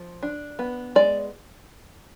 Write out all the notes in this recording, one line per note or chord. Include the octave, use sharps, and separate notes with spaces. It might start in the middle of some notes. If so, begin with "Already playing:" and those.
Already playing: F3
D4
B3
G#3 D5